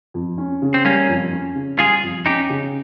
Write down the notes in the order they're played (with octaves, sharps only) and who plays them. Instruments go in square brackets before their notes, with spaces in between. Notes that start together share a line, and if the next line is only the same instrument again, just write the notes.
[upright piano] F2
C#4
C#3
[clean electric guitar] C4
[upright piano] G3 [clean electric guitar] A#3 C#4
[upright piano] F2
C#4
C#3
[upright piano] G3 [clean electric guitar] F4 G#4
[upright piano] F2
[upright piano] C#4 [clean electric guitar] D#4 G4
[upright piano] C#3